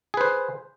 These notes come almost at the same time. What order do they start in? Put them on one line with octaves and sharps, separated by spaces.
G#4 B4 C5